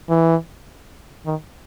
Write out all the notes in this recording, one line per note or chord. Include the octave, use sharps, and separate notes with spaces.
E3
D#3